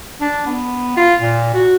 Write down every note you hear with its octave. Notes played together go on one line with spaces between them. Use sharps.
D4
B3
F4
A#2
F#4